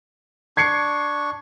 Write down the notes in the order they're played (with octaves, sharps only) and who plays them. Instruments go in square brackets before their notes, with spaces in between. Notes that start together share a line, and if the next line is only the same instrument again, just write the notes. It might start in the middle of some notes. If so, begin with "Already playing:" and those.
[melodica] D4 C#6 [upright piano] G#6 C7 C#7